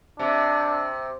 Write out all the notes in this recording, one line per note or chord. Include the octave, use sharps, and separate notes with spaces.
C3 D4